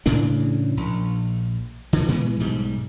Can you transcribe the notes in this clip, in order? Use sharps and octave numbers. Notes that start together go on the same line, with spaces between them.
A2 C#3 E3 D4
A#1
D3 D#3
A#2 E3 G#3 B3
B1 G#2 G3